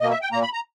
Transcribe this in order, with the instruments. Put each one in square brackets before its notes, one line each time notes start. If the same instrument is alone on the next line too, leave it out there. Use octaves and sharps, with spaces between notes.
[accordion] B2 A#3 D#5
E5
G5
A#2 A#3 A#5
B5
A#5